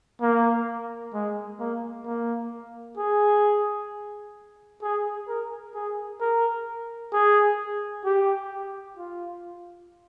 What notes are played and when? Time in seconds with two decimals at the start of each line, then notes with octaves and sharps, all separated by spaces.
0.21 A#3
1.14 G#3
1.60 A#3
2.05 A#3
2.97 G#4
4.82 G#4
5.28 A#4
5.75 G#4
6.20 A#4
7.13 G#4
8.05 G4
8.97 F4